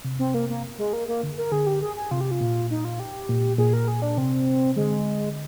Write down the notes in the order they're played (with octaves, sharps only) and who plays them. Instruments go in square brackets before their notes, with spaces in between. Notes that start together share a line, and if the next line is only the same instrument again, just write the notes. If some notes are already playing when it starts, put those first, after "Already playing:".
[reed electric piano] C3
[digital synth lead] C4
A#3
A#3
G#3
A#3
A#3
[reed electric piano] D3
[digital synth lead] A#4
[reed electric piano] D3 [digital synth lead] G#4
[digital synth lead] G4
G#4
G#4
[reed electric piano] C3 [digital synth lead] F4
[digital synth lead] G4
F4
[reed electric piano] A#2
[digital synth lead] D#4
F4
G4
[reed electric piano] A#2
[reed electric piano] A#2 [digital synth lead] G#4
[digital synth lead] A#4
G#4
D4
[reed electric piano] C3 [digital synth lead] C4
[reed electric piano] D3 [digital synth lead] G#3